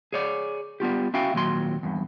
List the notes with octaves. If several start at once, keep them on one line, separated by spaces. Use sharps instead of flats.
G#4 C#5 D5
G3 B3 F4 G4
C#4 E4 F#4 F5 G5
D#2 A#2 F#3 C6
E2 G2